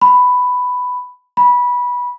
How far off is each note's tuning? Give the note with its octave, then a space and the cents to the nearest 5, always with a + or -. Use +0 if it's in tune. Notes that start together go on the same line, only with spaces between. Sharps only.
B5 +10
B5 -15